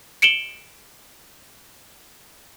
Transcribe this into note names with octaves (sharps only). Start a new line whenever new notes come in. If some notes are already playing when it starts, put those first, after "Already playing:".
C#7 D7 E7 F#7 G7